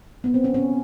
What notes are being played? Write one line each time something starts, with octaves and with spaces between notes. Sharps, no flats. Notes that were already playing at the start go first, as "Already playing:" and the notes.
B3
C4
C#4
C#4